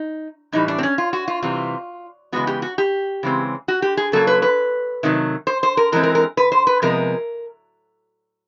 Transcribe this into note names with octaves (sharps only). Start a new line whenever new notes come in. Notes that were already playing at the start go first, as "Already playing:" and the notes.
Already playing: D#4
A2 E3 G3 D#4
D4
C4
C#4
F4
F#4
F4
C3 E3 G3 C4 F4
C#3 E3 G#3 B3 F#4
G4
F#4
G4
C#3 E3 G#3 C4
F#4
G4
G#4
C#3 F#3 A#3 A4
B4
B4
C3 D#3 F#3 A3
C5
C5
A#4
E3 G#3 C4 A#4
A#4
A#4
B4
C5
B4
C3 F3 G#3 B3 A#4